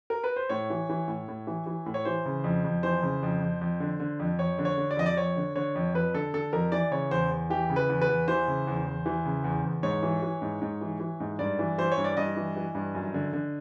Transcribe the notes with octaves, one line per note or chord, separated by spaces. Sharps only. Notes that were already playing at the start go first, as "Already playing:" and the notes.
A#4
B4
C5
A2 C#5
E3
E3
A2
A2
E3
E3
A2
C#5
E3 C5
C#3
F2
F2
E3 C5
C#3
F2
F2
F2
D3
D3
F2
F2 C#5
D3
C#5
D3
D5
F2 D#5
D5
F2 C#5
D3
D3 C#5
F2
F2 B4
D3 A4
D3 A4
F2 A#4
E3 D5
C#3 C#5
E2 C5
E2
E3 G4
C#3
B4
E2
B4
E2
E3 C5
C#3
E2
E2
E3
C#3
E2
E2
G#2 C#5
E3
E3
G#2
G#2
E3
E3
G#2
G2 D5
E3
E3 C5
C#5
G2
D5
G2 D#5
E3
E3
G2
F#2
D3
D3